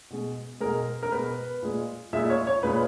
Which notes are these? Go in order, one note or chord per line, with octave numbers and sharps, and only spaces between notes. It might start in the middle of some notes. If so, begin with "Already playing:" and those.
B2 G#3
B2 G#3 A#4
A#4
B2 G#3 B4
A#2 G#3
A#2 G#3 E5
C#5
C#5
A#2 G#3 B4